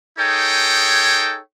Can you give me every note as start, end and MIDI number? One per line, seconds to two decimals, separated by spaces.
0.18 1.39 63
0.18 1.39 68
0.18 1.39 69
0.18 1.39 73
0.18 1.39 79